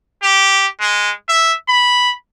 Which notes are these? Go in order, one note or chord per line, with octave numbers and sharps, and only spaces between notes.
G4
G#3
E5
B5